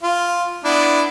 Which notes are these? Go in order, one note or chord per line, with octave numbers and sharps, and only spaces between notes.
F4
B3 D4 E4